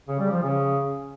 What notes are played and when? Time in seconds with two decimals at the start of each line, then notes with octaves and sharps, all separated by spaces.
0.08 C#3
0.20 G3
0.31 F3
0.42 C#3